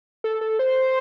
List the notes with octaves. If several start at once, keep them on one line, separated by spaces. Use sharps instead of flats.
A4
A4
C5